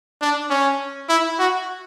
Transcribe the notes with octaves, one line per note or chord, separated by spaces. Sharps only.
D4
C#4
E4
F#4